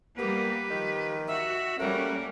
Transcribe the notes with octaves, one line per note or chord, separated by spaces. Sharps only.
G3 A#3 B3 G4 B4
D#3 F3
F#4 E5
G3 A3 A#3 C#4 A#4 F#5